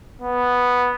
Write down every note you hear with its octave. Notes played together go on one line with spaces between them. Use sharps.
B3